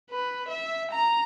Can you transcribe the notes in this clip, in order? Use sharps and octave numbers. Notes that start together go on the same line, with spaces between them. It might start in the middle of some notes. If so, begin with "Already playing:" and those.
B4
E5
A#5